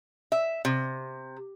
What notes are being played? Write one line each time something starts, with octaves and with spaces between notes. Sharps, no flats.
E5
C3